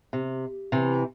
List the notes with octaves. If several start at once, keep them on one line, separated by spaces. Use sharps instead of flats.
C3
C3 E3